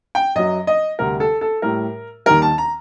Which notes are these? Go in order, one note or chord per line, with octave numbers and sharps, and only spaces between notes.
G5
F#2 F#3 D#5
D#5
D2 C3 G3 A#4
A4
A4
A2 G3 A#4
D#2 D#3 G3 A#4
A5
A#5